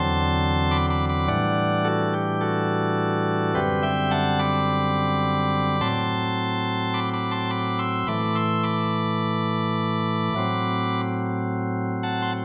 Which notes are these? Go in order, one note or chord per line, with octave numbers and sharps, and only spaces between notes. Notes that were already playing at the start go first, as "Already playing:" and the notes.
Already playing: E2 D3 F#3 C4 A5 C6
B5 D6
B5 D6
B5 D6
A2 E3 G3 D4 D5 F#5
F#4 A4
G4
F#4 A4
F#2 D3 G3 C4 G4 B4
E5 G5
F#5 A5
B5 D6
A2 F#3 C4 A5 C6
B5 D6
B5 D6
A5 C6
B5 D6
C6 E6
A2 E3 A3 B5 D6
C6 E6
B5 D6
A2 F#3 C4
F#5 A5
C6